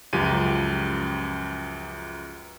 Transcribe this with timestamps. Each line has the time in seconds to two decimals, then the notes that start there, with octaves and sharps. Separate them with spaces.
0.13 C#2 F#2 F3 G4 D#7